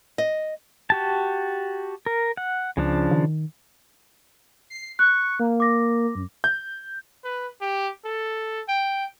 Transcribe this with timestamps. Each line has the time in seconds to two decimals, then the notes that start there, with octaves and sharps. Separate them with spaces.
0.18 D#5
0.90 F#4 G4 A5
2.06 A#4
2.37 F#5
2.77 C#2 C#3 F3 D4
3.11 D#3
4.70 C7
4.99 C#6 F#6
5.40 A#3
5.60 D6 A#6
6.15 F#2
6.44 G6
7.24 B4
7.61 G4
8.05 A4
8.69 G5